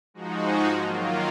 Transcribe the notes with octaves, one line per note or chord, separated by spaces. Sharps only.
G#2 F3 G#3 D#4 F#4
D#3 F#3 A#3 F4